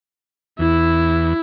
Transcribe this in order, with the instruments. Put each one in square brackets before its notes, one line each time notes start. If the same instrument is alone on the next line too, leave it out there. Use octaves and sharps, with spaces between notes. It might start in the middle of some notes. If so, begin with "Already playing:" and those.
[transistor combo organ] E2 [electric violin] E4